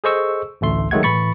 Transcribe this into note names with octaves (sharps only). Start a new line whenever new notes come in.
G#4 A4 C5 D#5 C#6 E6
A1 D2 A3 C6
D#3 F#3 G#3 A3 F#5 G#6
A2 E3 B5 C#6 A6 C#7